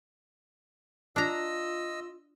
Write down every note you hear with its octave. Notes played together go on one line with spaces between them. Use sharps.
D4 F4 D#5 A#5 E6